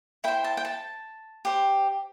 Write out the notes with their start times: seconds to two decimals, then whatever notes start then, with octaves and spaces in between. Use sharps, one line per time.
0.24 E4 C5 G5
0.44 A5
0.57 G5
0.65 A5
1.45 G4 C5